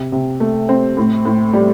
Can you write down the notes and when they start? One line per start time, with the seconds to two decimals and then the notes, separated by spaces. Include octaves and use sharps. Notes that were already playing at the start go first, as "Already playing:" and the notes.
Already playing: C3
0.12 C3
0.40 A3
0.69 C4
0.97 A2
1.25 A2
1.53 G3